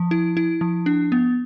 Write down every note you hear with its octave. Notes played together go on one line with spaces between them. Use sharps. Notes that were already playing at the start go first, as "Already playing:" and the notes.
Already playing: F3
E4
E4
F3
D4
B3